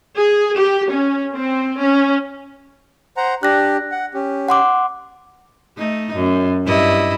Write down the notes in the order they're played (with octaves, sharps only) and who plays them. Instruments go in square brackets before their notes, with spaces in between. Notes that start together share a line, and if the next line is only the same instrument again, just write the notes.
[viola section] G#4
G4
C#4
C4
C#4
[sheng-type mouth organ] C5 F#5 A#5
[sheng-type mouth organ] D4 G4 [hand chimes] F#6 A#6
[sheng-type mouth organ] F#5
C#4 G4
[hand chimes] F#5 C6 D6
[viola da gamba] A3 D#4
F#2
G2 E4 D#5